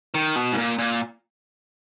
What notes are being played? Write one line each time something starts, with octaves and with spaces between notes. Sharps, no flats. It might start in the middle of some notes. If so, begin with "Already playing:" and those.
D#3
B2
G#2
A#2
A#2